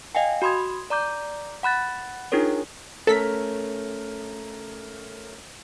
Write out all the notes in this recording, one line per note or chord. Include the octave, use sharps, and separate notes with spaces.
D#5 F5 G5 G#5
F#4 B5 C6 D#6 G#6
D5 A#5 D6 G6
F#5 B5 F#6 A6
D4 D#4 F4 G#4 A#4 C#5
A3 C#4 A4 A#4 B6